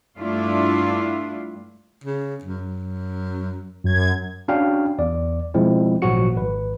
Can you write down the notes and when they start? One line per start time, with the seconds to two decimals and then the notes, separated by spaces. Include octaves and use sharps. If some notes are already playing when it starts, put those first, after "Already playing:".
0.18 G2 A3 D4 E4 F4
2.04 C#3
2.43 F#2
3.84 F#2 G#6
4.48 C#4 D4 F#4 F5 G5
4.99 E2 D5
5.54 B2 F3 G#3 C4 E4
6.02 G#1 A#2 F3 F#3 F#4 C#7
6.36 G#1 B4